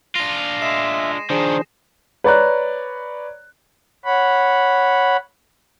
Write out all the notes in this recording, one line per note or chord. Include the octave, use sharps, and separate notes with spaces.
D4 F4 A#6 C7 D#7
G#3 E5 E7
D#3 F3 D4 G#4 C5
B4 C#5 D5 A#5 F#6
C#5 F#5 B5